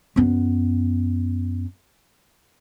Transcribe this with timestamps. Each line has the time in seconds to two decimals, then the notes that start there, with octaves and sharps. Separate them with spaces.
0.16 F#2 B3